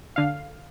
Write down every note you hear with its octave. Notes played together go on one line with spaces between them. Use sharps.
D3 F5